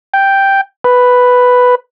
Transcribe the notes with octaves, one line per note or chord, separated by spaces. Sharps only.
G5
B4